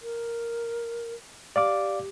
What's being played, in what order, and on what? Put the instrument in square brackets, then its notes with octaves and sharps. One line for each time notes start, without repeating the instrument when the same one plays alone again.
[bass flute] A#4
[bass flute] G4 [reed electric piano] D5 F5 D6